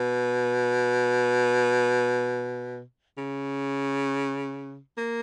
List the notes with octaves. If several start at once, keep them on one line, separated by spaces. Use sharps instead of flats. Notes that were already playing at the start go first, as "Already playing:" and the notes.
Already playing: B2
C#3
A#3